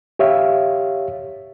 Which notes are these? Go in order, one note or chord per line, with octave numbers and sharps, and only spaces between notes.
G4 C#5 E5 F5